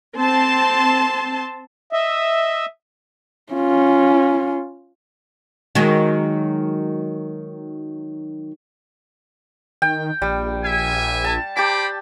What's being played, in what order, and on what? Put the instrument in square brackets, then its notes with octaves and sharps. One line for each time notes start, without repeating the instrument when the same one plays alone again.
[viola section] C4 A5 C6
[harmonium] D#5 E5
[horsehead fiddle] C#4 F4
[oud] D#3 F#3 G#3
[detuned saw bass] D#3 [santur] G5
[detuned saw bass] A#1 [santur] G3
[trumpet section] E5 G#5
[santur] A5
[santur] G4 A5 [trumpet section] C5 B5 D6